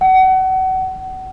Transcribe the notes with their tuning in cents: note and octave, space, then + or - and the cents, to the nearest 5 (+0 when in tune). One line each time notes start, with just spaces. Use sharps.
F#5 +30